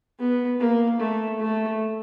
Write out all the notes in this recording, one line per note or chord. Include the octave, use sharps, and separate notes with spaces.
B3
A#3
A3
A3